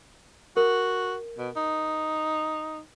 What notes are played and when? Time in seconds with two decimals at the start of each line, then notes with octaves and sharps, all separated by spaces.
0.57 F#4 A#4
1.38 B2
1.56 D#4